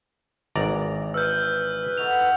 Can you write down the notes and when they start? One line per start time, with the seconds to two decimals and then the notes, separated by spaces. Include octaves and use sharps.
0.56 G#1 E3 D5 A#5
1.14 B4 E6 F6 G6
1.97 D#4 F#4 A4 F7